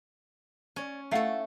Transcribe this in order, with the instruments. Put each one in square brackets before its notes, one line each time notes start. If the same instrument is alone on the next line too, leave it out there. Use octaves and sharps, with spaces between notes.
[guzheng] C#4 [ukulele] C#5 D5
[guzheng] A3 A4 [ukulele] E4 F5 F#5